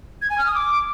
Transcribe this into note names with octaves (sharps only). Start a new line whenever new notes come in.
G#6
G#5
F6
D#6
D6